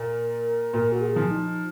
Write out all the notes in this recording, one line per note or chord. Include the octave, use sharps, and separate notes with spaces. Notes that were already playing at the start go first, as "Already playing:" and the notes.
Already playing: A#2 A#4
A#2 A#4
F#4
G#4
F3
D#4